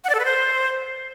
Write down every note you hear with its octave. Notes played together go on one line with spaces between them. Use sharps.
F#5
D5
A4
B4
C5